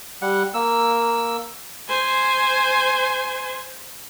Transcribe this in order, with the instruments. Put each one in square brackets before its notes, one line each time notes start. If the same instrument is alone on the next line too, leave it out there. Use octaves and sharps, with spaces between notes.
[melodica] G3 F#5
A#3 E6
[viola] C5 G#5